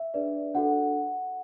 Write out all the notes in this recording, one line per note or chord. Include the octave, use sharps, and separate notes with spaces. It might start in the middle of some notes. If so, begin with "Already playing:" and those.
Already playing: E5
D4 G#4 B4 D5
D4 F#4 A4 F#5